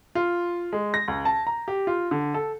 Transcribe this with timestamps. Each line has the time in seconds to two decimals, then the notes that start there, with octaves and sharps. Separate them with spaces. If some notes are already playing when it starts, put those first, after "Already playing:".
0.15 F4
0.73 G#3
0.94 A#6
1.08 C#2
1.25 A5
1.47 A#5
1.68 G4
1.87 F4
2.11 D3
2.34 A4